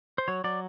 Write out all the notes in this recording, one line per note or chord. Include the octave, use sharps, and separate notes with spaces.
C5
F#3 C#5
F#3 D5